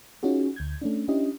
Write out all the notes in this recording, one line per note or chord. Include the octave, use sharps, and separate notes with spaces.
C#4 D#4 F4 F#4 G#4
D2 G6 G#6
A3 C#4 D4
C#4 D4 E4 G4 D#5